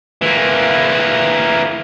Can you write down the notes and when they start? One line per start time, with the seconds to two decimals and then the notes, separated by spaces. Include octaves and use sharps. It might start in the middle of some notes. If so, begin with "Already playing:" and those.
0.22 E3 A#3